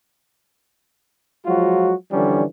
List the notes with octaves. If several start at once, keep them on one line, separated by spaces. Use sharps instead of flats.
F3 F#3 G#3 F4 F#4
D3 E3 F3 G3 C#4 D4